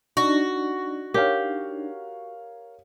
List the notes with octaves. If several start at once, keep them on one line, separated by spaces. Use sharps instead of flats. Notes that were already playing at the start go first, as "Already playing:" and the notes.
D4 D#4 F#4
G4 A#4 C#5 F5